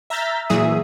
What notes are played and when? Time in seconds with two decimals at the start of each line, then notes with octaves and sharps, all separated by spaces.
0.10 E5 A#5 F6 G6 A6 B6
0.50 A#2 E3 F#3 G#4 E5 D#6